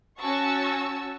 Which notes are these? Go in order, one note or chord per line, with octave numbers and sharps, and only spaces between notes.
C#4 F#4 A5 C#6 E6